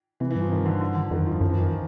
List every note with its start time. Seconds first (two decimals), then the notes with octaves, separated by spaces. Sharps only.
0.20 C3 E3
0.30 E3
0.36 G2
0.41 F3
0.51 D#3
0.66 D3
0.81 D3
0.95 D3
1.11 F2 D#3
1.21 F#2
1.26 F3
1.31 G2
1.41 F#2 F3
1.49 E3
1.58 D#3
1.65 E3